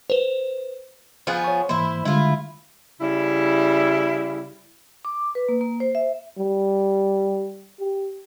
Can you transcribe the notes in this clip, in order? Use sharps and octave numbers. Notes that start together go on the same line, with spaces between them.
B4 C5
F3 B3 F4 G#4 F5 F#6
C#5 C#6
G#2 E3 A#3 E4 C5
D3 G3 G#3 E4 F4
C#3 G3 E4
D6
B4
A#3
A#3
C5
E5
G3
G4